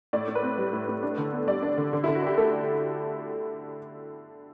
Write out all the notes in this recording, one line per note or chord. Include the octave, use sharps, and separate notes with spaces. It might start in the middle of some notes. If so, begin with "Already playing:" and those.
A2 D5
A2
B4
C4
G3
A2
A2
D4
D3
B3
G3 D5
D4
D3
D3
D3 E4
F#4
D4 G4
A3 A4